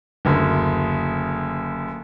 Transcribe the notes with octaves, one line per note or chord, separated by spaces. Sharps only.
F#1 D2